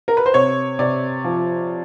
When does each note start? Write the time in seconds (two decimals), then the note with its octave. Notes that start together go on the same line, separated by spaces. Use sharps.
0.08 A#4
0.17 B4
0.26 C5
0.34 C3 C#5
0.79 C3 D5
1.24 F3